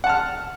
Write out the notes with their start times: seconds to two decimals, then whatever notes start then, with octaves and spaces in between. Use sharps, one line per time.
0.04 F#5
0.07 A5
0.09 F6